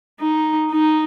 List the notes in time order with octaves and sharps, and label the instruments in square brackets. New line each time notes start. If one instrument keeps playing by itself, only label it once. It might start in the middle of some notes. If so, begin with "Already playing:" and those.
[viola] D#4
D#4